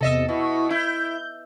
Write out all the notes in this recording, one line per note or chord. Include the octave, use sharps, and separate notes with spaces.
E2 C3 A4 D#5 E5
B2 E4 C#6
E4 G6